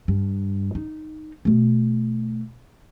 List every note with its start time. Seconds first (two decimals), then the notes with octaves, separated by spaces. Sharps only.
0.08 G2
0.75 D#4
1.45 B2 A3